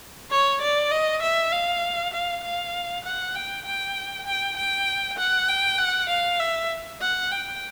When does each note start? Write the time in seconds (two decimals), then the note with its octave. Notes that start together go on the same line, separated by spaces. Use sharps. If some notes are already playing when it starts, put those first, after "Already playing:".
0.30 C#5
0.62 D5
0.91 D#5
1.22 E5
1.52 F5
2.13 F5
2.43 F5
3.05 F#5
3.35 G5
3.65 G5
4.26 G5
4.57 G5
5.18 F#5
5.48 G5
5.78 F#5
6.09 F5
6.39 E5
7.01 F#5
7.31 G5